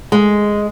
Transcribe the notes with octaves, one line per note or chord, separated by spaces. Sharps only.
G#3